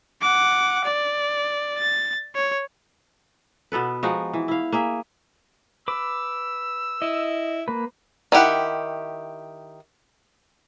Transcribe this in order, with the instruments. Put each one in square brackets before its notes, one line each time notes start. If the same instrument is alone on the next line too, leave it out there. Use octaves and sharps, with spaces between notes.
[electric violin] F#5 D6
D5
A6
C#5
[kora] B2 B3 A4 B4
F3 G#3 D#4 F#4
E3
E4 F5
A#3 G#4 E5
[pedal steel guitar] B4 D6 [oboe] E6
[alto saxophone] E4 [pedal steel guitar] D#5
[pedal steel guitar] A#3 B4
[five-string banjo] D#3 E4 G4 F#5